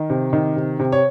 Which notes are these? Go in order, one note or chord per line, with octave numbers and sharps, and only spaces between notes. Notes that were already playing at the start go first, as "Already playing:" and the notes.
Already playing: D#3
C3
D#3
C3
C3
C#5